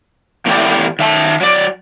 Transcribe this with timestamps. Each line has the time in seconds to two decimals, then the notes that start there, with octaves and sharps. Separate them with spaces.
0.46 E2 A2 A3 E4 G4 D5
0.99 D#3 E5 A5
1.41 F#3 D5